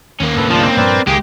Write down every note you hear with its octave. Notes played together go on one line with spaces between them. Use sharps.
D#2 A#3 C#4
D2 G#2 C3 A4 B4
F3 G#3 D4 F4
C4
G2 A#2 F3 A#4 B4 D5
C#2 D#3 G#3 A#3 G4 G#4